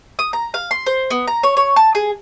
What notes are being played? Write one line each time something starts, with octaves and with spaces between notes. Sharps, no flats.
D#6
A#5
F5
C6
C5
B3
A#5
C#5
C#5
A5
G#4